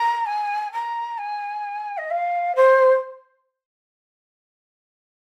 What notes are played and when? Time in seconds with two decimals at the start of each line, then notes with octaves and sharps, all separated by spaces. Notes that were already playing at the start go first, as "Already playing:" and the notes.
Already playing: A#5
0.26 G#5
0.72 A#5
1.18 G#5
1.98 D#5
2.10 F5
2.56 C5